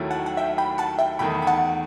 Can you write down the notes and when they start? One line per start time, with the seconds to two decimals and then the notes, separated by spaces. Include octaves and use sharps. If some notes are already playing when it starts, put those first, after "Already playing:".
Already playing: D#2 D#3 F#3 A3 E4
0.11 F#5 A5
0.26 F#5
0.37 E5 G5
0.58 G5 B5
0.78 F#5 A5
0.99 E5 G5
1.19 E2 D#3 A3 G5 B5
1.42 B5
1.47 F#5 A5